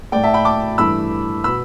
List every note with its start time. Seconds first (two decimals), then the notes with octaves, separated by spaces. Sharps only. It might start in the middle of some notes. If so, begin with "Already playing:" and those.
0.12 A2 A3 D5 G5
0.23 E5 A5
0.34 G5 B5
0.45 A5 D6
0.78 G2 E3 A3 B5 E6
1.44 B2 B3 B5 E6